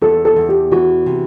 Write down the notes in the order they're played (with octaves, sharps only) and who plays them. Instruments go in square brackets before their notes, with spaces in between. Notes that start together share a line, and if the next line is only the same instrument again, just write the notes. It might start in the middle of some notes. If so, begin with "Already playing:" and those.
[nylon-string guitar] E2 [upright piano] A4
[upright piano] A4
[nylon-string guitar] E2
[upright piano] G4
[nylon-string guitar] E3 [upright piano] F#4
[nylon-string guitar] C3